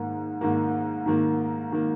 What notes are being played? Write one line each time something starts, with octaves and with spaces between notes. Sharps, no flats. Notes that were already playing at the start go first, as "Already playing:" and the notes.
Already playing: G#2 D#3 A#3
G#2 D#3 A#3
G#2 D#3 A#3
D#3 A#3